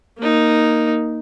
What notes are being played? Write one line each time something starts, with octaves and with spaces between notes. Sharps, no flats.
A#3 D#4